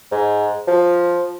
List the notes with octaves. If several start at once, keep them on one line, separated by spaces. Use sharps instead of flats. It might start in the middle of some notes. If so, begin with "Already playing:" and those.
G#2
F3